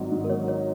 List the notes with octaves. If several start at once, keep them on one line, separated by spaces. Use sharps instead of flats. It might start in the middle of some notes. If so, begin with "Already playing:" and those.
Already playing: G#1 F#3 D#4
G#2
A#4
F#3 C#5
D#4 C#5